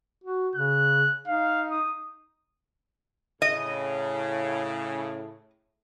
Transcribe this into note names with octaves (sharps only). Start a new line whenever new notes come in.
F#4
C#3 F#6
D#4 F5
D#6
A2 C#3 D#5